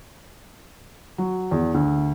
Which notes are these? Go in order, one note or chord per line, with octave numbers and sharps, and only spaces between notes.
F#3
E2
D2